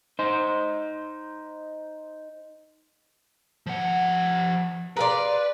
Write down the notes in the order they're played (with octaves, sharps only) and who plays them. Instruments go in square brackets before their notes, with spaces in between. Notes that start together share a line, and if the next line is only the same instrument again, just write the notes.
[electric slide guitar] D#4 C5
[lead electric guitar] F3 F#5
[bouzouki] G#4 D5 [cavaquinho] A#4 F5 C6 [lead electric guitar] B4